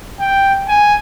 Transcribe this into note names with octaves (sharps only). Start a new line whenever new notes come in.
G5
G#5